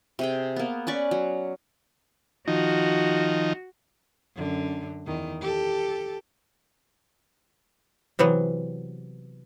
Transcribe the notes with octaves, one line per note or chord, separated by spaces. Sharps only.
C3 G#4 G5
A#3 B3
C#4 B4 D5 C#6
F#3
D#3 F3 D#4 F#4
F#2 D3
E2 D#3
G4 A4
C3 E3 F#3 B3